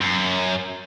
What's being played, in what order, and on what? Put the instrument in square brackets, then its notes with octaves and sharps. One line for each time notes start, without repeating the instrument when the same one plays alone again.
[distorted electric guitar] F#2